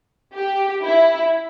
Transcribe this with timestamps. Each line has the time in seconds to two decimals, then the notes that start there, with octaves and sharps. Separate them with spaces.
0.33 G4
0.83 E4